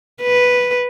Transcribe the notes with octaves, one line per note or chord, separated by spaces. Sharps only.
B4